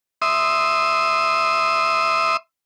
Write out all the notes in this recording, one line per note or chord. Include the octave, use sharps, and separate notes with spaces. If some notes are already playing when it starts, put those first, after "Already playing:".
E5 C6 D#6